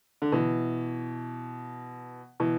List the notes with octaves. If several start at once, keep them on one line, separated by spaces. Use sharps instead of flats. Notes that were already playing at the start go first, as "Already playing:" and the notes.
D3
B2 E3
B2 E3